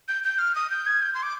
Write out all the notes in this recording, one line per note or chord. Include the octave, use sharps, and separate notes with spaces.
G6
G6
F6
D#6
G6
G#6
G6
C6
D6